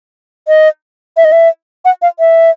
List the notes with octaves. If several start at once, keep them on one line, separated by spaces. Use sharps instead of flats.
D#5
E5
D#5
E5
F#5
F5
E5